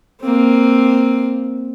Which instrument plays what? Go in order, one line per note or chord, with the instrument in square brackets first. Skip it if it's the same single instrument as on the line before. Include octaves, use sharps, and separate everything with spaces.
[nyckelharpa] A#3 C4